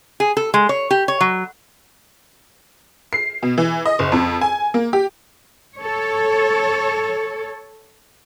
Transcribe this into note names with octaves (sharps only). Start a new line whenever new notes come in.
G#4
A4
G#3
C#5
G4
C#5
F#3
C7
B2
E3
D#5
F#1
F2
G#5
A#3
G4
A4 C#5